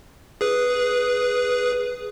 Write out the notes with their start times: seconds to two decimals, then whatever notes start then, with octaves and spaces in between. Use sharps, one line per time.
0.41 G#4 B4